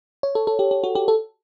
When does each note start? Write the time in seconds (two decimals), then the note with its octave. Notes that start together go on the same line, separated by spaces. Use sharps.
0.23 C#5
0.35 A4
0.47 A4
0.59 G4
0.71 G4
0.84 F#4
0.95 G4
1.08 A4